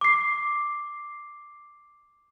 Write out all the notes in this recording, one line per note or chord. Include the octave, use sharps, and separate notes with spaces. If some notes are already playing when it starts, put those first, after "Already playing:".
D6 C7